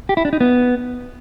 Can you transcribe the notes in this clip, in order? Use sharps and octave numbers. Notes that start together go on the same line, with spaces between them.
G4
E4
D4
D#4
B3